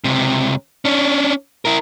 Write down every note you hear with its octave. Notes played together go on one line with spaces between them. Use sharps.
C#2 C3
C#4 D4
E4 A#4